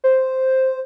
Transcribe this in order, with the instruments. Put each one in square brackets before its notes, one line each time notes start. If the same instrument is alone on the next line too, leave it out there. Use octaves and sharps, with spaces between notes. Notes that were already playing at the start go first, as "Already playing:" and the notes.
[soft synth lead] C5